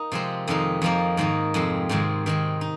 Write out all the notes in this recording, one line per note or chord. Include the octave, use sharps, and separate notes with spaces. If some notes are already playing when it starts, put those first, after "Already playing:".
Already playing: A#3 D#4
C3 F3 G#3 C4
F2 C3 D#3 G#3 D#4
F2 F3 A#3 D#4
G#2 D#3 A#3 D#4
F2 C3 G#3 C4
G#2 D#3 G#3 C4
D#3 G#3 C4
D#4